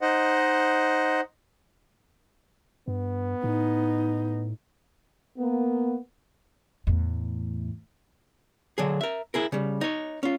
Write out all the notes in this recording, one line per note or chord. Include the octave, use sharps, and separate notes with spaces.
D#4 C5 D#5 F#5
G2 B3
A2 D#4
A#3 B3
E2 A2
D3 F#3 G#4
A#4 E5
E4 G#4 A#4
C#3 G3
D#4 C#5
C#4 F4